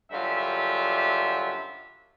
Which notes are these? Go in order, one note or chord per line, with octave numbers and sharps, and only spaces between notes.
F#2 D3 G3 F4 E5